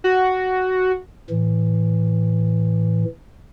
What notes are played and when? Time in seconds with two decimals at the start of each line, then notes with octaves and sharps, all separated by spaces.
0.04 F#4
1.30 A2 E3